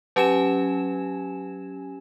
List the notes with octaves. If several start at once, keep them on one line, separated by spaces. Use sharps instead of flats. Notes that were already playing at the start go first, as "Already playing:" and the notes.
F#3 C#4 G4 G#5 G#6 E7